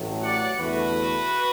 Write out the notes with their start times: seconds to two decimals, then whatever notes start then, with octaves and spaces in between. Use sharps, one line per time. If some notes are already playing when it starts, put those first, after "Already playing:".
Already playing: A1 A2 F#3 A3
0.24 D5 F#5
0.59 E2 D3 A3 F#4 B4